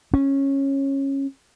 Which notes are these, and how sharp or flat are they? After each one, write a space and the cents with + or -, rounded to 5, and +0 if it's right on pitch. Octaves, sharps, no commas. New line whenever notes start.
C#4 -15